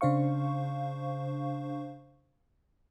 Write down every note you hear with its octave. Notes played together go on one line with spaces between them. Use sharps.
C#3 D4 C5 F5 C#6